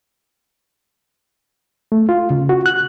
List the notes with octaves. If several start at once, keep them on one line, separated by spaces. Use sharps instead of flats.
A3
F4
C#3
F#4
F#6